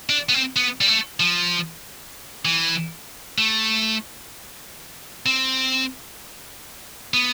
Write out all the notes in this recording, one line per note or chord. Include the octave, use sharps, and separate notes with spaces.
D4
B3
C4
B3
G3
A3
F3
E3
A3
C4
B3